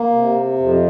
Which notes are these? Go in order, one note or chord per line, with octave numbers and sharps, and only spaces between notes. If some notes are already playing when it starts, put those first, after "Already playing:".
Already playing: A#3
C3
F2